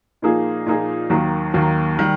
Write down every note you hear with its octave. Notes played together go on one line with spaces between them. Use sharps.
A#2 F3 A#3 D#4 G#4
A#2 F3 A#3 D#4 G#4
D#2 D#3 F#3 A#3
D#2 D#3 F#3 A#3
D#3 G3